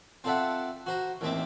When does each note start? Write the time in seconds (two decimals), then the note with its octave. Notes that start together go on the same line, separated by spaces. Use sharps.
0.24 C4 F4 A4 D5 E5 F#5
0.86 F#4 C5 A#5
1.21 A1 D#2 C4 E5 D6